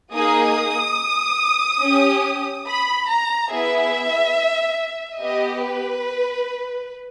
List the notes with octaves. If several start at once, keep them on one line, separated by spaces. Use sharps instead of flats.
A#3 D#4 G#4 D#6
C#4 G4
B5
A#5
B3 E4 G#4 E5
B3 G4 D#5
B4